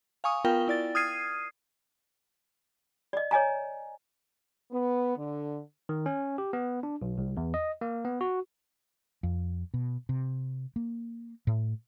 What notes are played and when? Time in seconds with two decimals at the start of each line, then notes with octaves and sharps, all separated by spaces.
0.24 F5 G#5 C#6 D#6
0.45 B3 F4 A#4 F5 G5 G7
0.68 E4 D5 A6
0.95 D#6 F6 G#6 C7 D#7
3.13 D5 D#5
3.31 C#5 D#5 G#5 A#5
4.71 B3
5.17 D3
5.89 D#3
6.06 C#4
6.38 G4
6.53 B3
6.83 D4
7.02 B1
7.18 C2
7.37 E2
7.54 D#5
7.81 A#3
8.05 B3
8.21 F#4
9.23 F2
9.74 B2
10.09 C3
10.76 A#3
11.47 A2